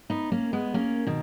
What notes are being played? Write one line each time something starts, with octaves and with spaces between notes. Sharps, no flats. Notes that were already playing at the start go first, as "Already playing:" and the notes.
B3 D#4
A#3 C#4
G#3 B3
A#3 C#4
B2 D#3